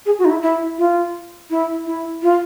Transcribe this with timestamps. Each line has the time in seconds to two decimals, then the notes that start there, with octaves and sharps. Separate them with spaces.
0.06 G#4
0.19 F#4
0.25 D#4
0.30 E4
0.42 E4
0.78 F4
1.50 E4
1.87 E4
2.22 F4